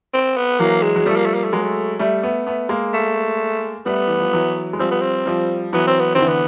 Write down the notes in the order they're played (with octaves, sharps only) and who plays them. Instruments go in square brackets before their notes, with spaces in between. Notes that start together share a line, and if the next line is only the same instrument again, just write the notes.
[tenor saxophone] C4
B3
[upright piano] E3 F#3 [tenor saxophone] A#3
[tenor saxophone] G#3
[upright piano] F#3
[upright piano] F3 G3 [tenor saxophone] A3
[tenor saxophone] A#3
A3
A#3
A3
[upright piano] F#3 G#3 [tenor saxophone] A#3
[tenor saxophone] A3
[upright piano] G3 A3
A3 B3
A3 B3
G#3 A#3
[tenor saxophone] A3
[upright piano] G3 A3 [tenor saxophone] B3
[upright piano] E3
F3
E3 F#3
G#3
[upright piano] F3 G3 [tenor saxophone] C4
[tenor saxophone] B3
C4
[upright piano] F3 G3
[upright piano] E3 F#3 [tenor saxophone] B3
[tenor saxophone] C4
B3
[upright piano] D#3 [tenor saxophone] C4
[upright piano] D3 E3
[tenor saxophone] B3